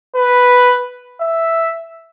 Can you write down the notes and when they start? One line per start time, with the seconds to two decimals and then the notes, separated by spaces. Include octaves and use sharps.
0.16 B4
1.21 E5